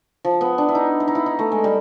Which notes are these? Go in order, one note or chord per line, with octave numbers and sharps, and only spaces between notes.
F3
B3
D4
E4
D#4
E4
D#4
E4
D#4
A3
G#3
G3